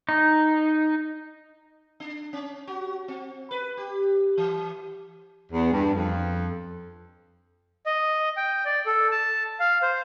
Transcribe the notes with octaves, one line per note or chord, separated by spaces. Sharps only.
D#4
D4
C#4
F#4
C4
B4
G4
E3
E2
G2
F2
D#5
G5
D5
A4
A5
F5
C5